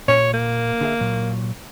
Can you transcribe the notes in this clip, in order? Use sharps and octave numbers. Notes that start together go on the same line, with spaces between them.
A#2 C#5
A#3
D3 G#4 E5
A#2 F#3